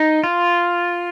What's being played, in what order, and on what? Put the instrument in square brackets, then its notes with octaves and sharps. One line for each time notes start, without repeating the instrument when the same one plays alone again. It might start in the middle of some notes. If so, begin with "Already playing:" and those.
Already playing: [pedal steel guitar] D#4
F4